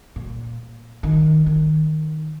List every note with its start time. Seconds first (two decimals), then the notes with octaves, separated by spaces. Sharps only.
0.16 A#2
1.03 D#3
1.46 D#3